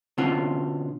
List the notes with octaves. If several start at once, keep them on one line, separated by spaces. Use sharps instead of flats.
B2 D3 C4 C#4 F4 F#5